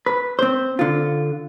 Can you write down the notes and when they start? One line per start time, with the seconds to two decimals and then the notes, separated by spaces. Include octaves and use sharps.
0.06 B4
0.39 C4 C5
0.79 D3 F4